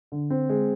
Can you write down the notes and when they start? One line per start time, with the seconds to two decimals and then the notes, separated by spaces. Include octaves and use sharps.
0.12 D3
0.30 C4
0.49 G#3